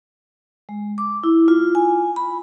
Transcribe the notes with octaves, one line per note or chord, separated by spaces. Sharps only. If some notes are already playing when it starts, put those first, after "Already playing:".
G#3
D6
E4
F4
G#5
B5